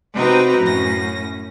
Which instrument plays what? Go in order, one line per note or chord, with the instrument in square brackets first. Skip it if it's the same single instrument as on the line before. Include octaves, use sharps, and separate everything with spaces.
[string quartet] C3 C4 D#4 F#4 B4 A#5
F#2 A2 C#4 A#6